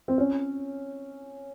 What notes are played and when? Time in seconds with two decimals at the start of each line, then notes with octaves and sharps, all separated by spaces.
0.08 C4
0.18 C#4